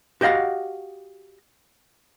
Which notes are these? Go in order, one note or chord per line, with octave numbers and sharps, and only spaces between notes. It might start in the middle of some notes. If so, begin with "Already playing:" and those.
F#4 G4 D#5 F5 F#5